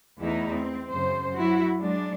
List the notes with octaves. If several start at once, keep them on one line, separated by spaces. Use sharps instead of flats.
E2 A3 B3 D#4 E4
C4
F#2 C#3 C5
F#3 E4 F#4
F#3 G#3 D4